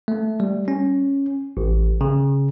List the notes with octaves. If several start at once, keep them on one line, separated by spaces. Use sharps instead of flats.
A3
G3
C#4
A1
C#3